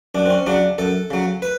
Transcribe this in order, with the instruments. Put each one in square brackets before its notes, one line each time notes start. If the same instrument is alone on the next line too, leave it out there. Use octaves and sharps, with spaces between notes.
[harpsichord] F#2 D4
C4
C#4
C#3 F#3 D4
F#2 A4
C#3 F#3
B4